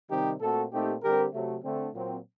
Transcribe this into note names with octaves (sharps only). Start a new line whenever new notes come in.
C3 D#3 G3 C4 D#4 G4
A#2 A3 C4 F#4 A4
A#2 A3 C4 D#4 G4
D3 G3 C4 G4 A#4
C3 F#3 A3
D3 A3 C4
A#2 F#3 C4